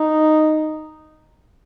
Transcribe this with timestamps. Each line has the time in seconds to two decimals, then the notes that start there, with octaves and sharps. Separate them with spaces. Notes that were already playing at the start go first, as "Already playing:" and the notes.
Already playing: D#4